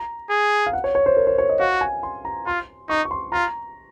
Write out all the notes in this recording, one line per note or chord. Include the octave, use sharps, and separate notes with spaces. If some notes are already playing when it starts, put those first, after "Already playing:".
Already playing: A#5
G#4
F5
F#5
C#5
C#5
C5
A#4
C5
C#5
D#5
F#4 F5
G#5
C6
A#5
F4 C6
D#4 C#6
C#6
C6
F4 A#5